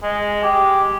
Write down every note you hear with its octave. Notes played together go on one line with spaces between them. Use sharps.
G#3
G4